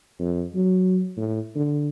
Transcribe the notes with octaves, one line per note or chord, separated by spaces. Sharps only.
F2
F#3
A2
D3